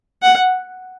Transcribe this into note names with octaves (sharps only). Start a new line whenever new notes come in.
F#5